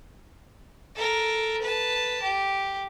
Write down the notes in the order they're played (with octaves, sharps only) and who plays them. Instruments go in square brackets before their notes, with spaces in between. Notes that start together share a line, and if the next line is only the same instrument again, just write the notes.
[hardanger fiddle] A4 A#4
B4 A5
G4